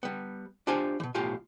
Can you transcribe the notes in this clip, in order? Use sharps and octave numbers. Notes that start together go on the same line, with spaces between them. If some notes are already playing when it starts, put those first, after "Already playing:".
G3 B3
D4 F4 G4 C5 F5 G#5
B2 E3
B1 A2 F4 G4 F5 G#5